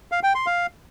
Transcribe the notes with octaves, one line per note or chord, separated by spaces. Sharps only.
F5
G5
C6
F5